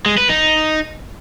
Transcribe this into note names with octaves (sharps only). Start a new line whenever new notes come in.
G#3
B4
D#4